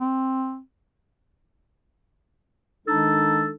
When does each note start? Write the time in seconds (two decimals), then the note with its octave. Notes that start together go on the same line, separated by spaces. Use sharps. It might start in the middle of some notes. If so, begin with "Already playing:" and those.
0.01 C4
2.87 D#3 G#3 D4 D#4 A4